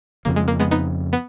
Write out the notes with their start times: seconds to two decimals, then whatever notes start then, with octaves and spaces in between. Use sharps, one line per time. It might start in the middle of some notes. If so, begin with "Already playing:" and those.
0.25 F2 C#3 F3 A#3
0.36 G#3
0.48 A#3
0.60 G#3 B3
0.71 B3 D#4
1.13 B3